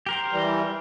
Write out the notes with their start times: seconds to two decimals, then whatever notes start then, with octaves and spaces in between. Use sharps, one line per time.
0.06 G4 A#4 C5
0.33 E3 G3